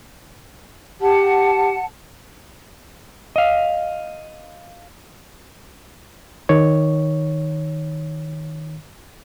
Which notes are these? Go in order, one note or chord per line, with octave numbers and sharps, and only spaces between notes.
G4 F#5 A5
D#5 F5
D#3 C#5